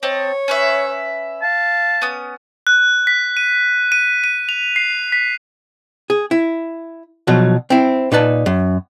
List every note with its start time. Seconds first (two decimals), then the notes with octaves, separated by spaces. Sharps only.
0.03 C4 C#5 D#5 A5
0.48 C#4 B4 E5
1.42 F5 A5
2.02 B3 C#4 D#6
2.67 F#6
3.07 B6
3.37 D#7
3.92 D#7
4.24 D#7
4.49 F7
4.76 C7
5.12 B6
6.10 G#4
6.31 E4
7.27 B2 F3 F#3
7.70 C4 E4
8.12 A#2 D#4 B4 A5
8.46 F#2